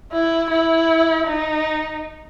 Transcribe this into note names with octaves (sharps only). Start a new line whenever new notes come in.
E4
E4
D#4